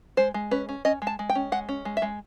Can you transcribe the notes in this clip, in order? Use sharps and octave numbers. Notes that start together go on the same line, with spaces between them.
G#3 C5
G#3
C#4 B4
C#4
C#4 D#5
G#3
A5
G#3
G5
C#4
G#3 F#5
C#4
G#3
E5
G#3